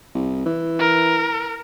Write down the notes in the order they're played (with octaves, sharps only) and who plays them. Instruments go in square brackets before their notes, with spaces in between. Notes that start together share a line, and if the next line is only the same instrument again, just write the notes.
[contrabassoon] C2
E3
[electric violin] A#4